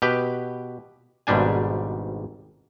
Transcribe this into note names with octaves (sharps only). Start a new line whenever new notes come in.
B2 G4 B4 G5
G#1 G#2 B2 G3 D4 G#5